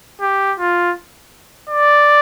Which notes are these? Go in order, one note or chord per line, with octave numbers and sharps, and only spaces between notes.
G4
F4
D5